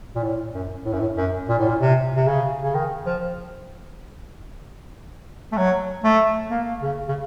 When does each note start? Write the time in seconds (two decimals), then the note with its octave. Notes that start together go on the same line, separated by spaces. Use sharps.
0.16 A#2
0.23 A2
0.54 F#2
0.85 A2
0.93 F#2
1.00 A2
1.17 F#2
1.49 A#2
1.59 A2
1.69 A#2
1.80 C3
2.16 C3
2.27 C#3
2.64 C#3
2.75 D#3
3.06 F3
5.52 A3
5.57 F#3
6.04 A3
6.51 A#3
6.82 C#3
7.08 C#3